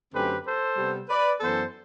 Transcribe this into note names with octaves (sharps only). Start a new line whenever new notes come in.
F#2 D3 A3 C4 G4 B4
A4 C5
C3 G3 B3
B4 D5
F#2 E3 B3 A4 C5